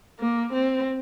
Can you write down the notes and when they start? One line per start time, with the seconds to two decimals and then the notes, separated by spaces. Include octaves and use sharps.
0.19 A#3
0.52 C4